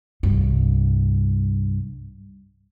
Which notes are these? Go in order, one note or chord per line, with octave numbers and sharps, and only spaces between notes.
C2 G2